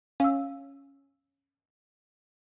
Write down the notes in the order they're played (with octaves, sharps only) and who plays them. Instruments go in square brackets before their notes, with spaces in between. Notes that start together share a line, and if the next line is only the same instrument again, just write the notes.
[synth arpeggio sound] C#4 [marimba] F5 E6